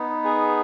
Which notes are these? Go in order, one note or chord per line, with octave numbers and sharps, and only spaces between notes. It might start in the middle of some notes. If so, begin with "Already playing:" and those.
Already playing: B3 D#4
G#4